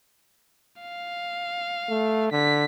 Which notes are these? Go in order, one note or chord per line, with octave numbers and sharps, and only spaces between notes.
F5
A3
D3 B6